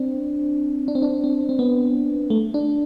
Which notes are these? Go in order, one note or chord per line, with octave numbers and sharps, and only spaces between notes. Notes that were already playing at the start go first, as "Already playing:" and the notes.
Already playing: C4 D4
D4
C4
D4
C4
C4
B3
A3
D4